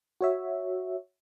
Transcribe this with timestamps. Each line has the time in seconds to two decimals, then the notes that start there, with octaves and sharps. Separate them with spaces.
0.21 F#4 C#5 E5